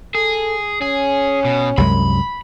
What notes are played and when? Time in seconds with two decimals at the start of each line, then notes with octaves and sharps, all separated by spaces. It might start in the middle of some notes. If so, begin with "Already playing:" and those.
0.15 G#4 A4
0.82 C#4 G#4
1.45 B2
1.78 C2 F#2 G#3 B5